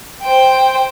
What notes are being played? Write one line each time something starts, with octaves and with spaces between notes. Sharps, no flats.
C5 G5